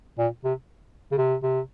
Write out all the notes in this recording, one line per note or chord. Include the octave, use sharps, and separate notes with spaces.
A#2
C3
C#3
C3
C3